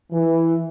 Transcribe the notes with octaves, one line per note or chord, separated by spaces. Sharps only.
E3